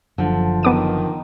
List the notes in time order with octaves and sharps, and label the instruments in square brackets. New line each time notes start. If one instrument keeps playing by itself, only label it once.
[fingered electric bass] F#1 F#2 [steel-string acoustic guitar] D3 F3
[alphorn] D#3 [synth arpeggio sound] B3 D6 D#7